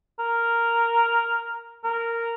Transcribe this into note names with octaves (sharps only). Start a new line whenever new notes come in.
A#4
A#4